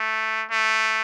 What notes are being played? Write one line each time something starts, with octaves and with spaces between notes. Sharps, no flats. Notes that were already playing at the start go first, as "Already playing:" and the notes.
Already playing: A3
A3